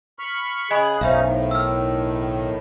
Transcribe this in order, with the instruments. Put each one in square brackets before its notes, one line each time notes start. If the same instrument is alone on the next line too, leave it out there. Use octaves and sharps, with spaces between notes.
[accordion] B5 C#6 F6
[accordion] C#3 G#4 F#6 [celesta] D#5 G#5 B5
[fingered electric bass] B1 [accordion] F#2 C#4 D#4 [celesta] C5 E5 F5
[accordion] A2 D#3
[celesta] E6 F6